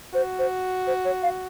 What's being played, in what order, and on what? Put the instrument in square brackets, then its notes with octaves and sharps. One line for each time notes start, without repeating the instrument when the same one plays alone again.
[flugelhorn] F#4 [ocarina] C5
[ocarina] C5
C5
C#5
F5